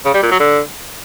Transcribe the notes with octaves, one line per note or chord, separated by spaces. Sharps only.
C#3
G3
A#2
F#3
D3